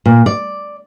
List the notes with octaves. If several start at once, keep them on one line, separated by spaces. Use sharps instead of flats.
A#2
D5